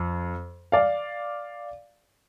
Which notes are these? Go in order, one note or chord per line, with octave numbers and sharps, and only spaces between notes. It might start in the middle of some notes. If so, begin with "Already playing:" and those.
Already playing: F2
D5 F5